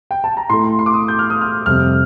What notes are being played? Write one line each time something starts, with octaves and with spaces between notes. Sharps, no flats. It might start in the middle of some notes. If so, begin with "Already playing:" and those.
G5
A5
A#5
A2 A3 C6
C6
C6
D6
D#6
G6
F6
D#6
F6
F2 C3 G3 F6